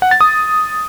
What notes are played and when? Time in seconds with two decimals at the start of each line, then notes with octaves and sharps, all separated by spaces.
0.02 F#5
0.11 A6
0.21 D#6